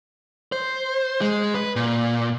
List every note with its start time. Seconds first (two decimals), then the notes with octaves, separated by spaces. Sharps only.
0.52 C5
1.21 G#3
1.54 B4
1.76 A#2